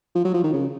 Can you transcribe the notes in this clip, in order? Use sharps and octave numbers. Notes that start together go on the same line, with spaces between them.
F3
F#3
F3
D#3
C#3